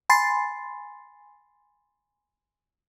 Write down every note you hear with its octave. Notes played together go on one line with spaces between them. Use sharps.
G#5 B5 C6 A6 C7